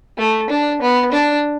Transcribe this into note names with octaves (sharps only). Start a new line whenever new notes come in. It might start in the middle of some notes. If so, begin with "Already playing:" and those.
A3
D4
B3
D4